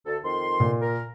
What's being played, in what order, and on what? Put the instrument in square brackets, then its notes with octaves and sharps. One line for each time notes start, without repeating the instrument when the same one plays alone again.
[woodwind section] D2 A4
F2 D#3 C6
[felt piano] A#2
[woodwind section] A#4